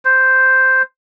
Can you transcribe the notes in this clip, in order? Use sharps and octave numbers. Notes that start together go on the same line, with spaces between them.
C5